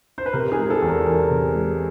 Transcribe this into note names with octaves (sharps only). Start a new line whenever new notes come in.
C5
B4
C3 A#4
G#4
G#3
G#4
A4
E2
A#4
E3 A#4
C3
G#3